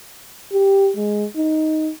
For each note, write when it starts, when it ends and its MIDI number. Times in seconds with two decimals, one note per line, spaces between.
0.53 0.91 67
0.97 1.26 56
1.36 1.91 63